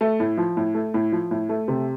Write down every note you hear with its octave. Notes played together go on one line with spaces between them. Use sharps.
A3
A2
F3
A2
A3
A2
F3
A2
A3
C3